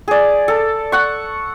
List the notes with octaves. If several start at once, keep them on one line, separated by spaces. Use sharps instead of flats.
G#4 D5
A4
F#5 C#6